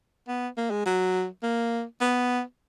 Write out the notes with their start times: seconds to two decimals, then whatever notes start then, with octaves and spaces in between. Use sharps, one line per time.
0.28 B3
0.57 A#3
0.71 G#3
0.86 F#3
1.43 A#3
2.01 B3